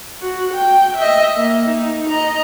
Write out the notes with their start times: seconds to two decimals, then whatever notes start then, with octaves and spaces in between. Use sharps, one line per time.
0.22 F#4
0.54 G5
0.97 D#5 E5
1.37 A#3
1.69 D#4
2.10 D#5 A#5